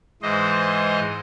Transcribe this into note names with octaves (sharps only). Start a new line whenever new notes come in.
G#2 E3 C5 D#5